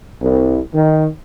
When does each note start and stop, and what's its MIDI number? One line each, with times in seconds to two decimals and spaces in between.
0.21 0.58 36
0.74 1.06 51